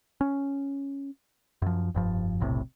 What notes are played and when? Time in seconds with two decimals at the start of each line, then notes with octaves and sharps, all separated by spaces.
0.21 C#4
1.62 F#2 F3
1.95 F1 G2 F3
2.40 E1 B1 A2 C3